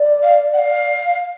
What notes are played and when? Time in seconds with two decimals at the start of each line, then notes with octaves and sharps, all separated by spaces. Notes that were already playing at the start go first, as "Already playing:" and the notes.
Already playing: D5
0.23 F5
0.53 F#5
0.58 F5